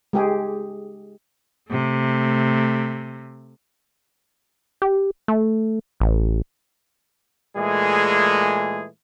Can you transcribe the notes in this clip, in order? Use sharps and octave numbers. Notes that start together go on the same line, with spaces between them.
G#3 G4 G#4
C3 A3
G4
A3
A1
A#2 E3 G#3 A3 G#4